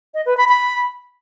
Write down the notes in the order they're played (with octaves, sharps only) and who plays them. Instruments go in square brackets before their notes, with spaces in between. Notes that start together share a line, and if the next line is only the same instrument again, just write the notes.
[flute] D#5
B4
B5
B5